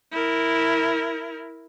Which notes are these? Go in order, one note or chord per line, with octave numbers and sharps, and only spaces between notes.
E4 A#4